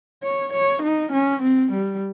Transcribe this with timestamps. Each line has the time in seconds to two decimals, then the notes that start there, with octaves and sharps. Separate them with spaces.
0.23 C#5
0.53 C#5
0.82 D#4
1.12 C#4
1.42 C4
1.72 G3